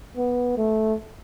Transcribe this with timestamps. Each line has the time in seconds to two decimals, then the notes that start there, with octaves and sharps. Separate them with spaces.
0.17 B3
0.57 A3